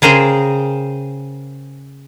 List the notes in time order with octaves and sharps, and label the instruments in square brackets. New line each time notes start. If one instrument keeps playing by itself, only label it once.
[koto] C#3 G#4 A#4 C5 G5